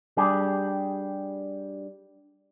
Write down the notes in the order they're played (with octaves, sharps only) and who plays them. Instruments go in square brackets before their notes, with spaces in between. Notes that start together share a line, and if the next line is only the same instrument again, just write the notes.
[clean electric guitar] G3 D4 G4 G#4